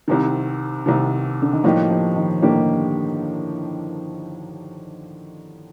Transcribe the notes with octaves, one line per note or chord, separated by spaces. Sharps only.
C2 C3 D#3
C2 C3 D#3
D3
D#3
A2 F3 G3 A#3 D#4 G4
F3
D#3
A2 D3 G3 A#3 D#4 G4